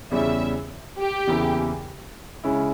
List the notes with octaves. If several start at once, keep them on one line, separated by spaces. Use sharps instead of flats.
E2 C#3 G3 C#4 E4 E5
G4
E2 C#3 E3 A#3 E4
C#3 G#3 C#4 E4